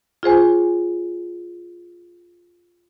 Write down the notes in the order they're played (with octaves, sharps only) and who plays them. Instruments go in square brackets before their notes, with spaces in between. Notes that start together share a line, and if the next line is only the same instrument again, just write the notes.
[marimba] F4 G#4 C5 G#5